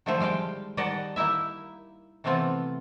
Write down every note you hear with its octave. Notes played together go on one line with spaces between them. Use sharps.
D3 D#3 F3 A3 C5
G3 G#3 F5 G5
D#3 G3 D5 D#5 F#5 A5
A#3 D#4 E4 E5
C3 E3 A3 B3 C4 F4